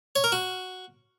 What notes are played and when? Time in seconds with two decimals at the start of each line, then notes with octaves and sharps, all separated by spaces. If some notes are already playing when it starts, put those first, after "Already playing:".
0.16 C#5
0.24 A#4
0.32 F#4